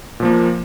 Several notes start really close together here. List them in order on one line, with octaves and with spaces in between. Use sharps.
A#2 F3 A#3